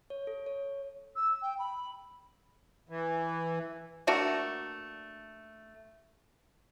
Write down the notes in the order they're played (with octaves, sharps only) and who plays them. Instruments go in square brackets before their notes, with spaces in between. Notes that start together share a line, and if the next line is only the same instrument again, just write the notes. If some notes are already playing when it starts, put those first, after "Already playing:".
[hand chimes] C#5
A4
C#5
[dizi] E6
G5
B5
[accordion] E3
[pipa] A3 A#3 D4 F#4